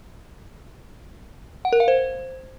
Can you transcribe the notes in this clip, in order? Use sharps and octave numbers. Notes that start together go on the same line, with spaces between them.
F#5
A#4
F5
C5